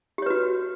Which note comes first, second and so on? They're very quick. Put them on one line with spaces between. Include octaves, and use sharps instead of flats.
G4 C#5 B4 F#4